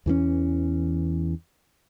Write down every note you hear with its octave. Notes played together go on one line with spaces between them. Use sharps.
E2 E3 A#3 C#4